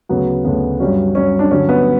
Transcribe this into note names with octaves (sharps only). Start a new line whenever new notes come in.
D2 C#3 F#3 B3
D2 C#3 F#3 B3
G2 F#3 C#4
G2 F#3 C#4
D4
G2 D3 F#3 C#4
B3